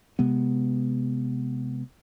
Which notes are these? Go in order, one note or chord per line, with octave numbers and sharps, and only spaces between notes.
C3 G#3 B3